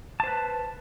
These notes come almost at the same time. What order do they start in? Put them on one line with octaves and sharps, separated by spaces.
A5 C5 B4